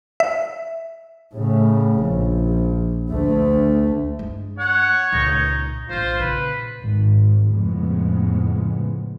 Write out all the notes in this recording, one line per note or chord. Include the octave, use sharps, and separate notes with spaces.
E5
A2 C#3
A#1
D2 A3
G2 G#3
C#5 F#5
C#2 A#2 D#4
A#1 A2 F4 C5
A#2 C#3 B4
G#1
F2 A2 C#3 G#3 B3